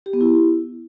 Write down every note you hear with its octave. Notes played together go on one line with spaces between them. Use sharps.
G4
B3
E4